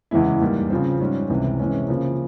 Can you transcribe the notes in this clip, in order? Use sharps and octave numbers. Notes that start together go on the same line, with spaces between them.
E2 C#3 E3 G#3 E4
G#2 G3 A#3
C#3 F3 C4
G#2 G3 C#4
C#2 C3 E3
C3 E3 G#3 C#4
C#3 F3 A#3